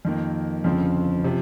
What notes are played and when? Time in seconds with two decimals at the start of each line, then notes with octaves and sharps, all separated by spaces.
0.05 F2 D#3 A#3
0.64 G1 F2 C#3 F3 C4
1.24 C3 F3